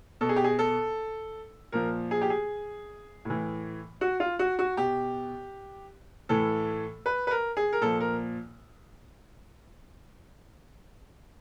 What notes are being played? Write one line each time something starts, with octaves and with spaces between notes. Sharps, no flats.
B2 A4
G#4
G4
G#4
A4
A#2 F3 A#4
G#4
G4
G#4
A2 E3
F#4
F4
F#4
F#4
B2 G4
A2 E3 A4
B4
B4
A#4
G#4
A#4
A#2 F3 A4
A#4